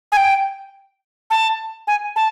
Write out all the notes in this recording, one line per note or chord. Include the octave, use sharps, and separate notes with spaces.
G#5
G5
A5
G#5
A5